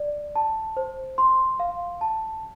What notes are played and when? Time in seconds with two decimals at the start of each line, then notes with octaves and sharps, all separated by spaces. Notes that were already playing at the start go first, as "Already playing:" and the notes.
Already playing: D5
0.36 A5
0.77 C5
1.18 C6
1.60 F5
2.01 A5